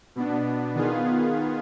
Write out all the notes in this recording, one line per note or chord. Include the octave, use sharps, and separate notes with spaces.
B2 B3 D4
D#3 B3 F4 G#4